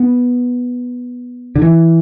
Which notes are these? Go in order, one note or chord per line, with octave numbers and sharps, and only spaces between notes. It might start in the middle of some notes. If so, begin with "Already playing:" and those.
Already playing: B3
D3
E3